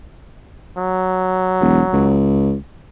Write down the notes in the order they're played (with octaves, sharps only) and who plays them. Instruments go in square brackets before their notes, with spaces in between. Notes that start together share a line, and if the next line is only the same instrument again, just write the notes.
[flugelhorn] F#3
[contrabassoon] E1
C#2